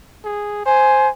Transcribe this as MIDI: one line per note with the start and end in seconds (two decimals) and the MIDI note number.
0.25 0.63 68
0.66 1.09 72
0.66 1.09 80